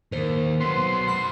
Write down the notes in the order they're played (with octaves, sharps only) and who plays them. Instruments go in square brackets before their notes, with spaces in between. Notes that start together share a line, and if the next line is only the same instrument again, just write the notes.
[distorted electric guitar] D#2 [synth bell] A#4 C5
[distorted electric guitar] F#3 B3 [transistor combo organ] C6
[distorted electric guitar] C5 F#5 [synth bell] B5 F6